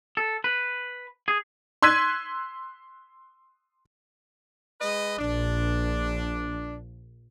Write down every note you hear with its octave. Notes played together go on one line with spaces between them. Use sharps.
A4
B4
G#4
C6 E6 F#6 G#6 B6 D#7
G#3 B4 D#5
A#1 D4